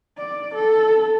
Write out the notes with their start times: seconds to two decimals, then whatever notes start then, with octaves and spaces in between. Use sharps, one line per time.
0.18 D5
0.54 A4